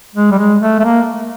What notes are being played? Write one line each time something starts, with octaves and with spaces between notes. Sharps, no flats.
G#3
G3
G#3
A3
A3
A#3